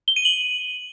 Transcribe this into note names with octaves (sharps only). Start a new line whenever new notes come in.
G7
D#7
F#7